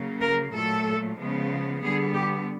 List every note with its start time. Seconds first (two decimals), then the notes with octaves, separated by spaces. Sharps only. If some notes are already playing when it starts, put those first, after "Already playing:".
Already playing: C#3 F#3 A#3
0.21 A#4
0.53 A#2 F#3 A3 A4
1.18 C#3 F3 G#3 B3
1.81 D3 G3 B3 G#4
2.13 G4